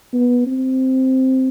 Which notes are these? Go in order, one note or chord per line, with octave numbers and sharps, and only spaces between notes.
B3
C4